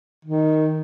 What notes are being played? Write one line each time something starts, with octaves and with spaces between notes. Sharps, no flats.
D#3